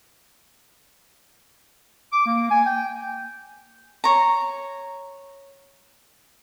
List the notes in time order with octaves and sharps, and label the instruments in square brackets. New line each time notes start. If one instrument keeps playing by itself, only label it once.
[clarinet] D6
A#3
G#5
G5
[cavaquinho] C#5 A#5